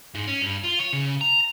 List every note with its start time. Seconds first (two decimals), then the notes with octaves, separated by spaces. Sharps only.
0.15 G#2
0.27 C#4
0.42 G2
0.64 F4
0.79 C#5
0.93 C#3
1.21 A#5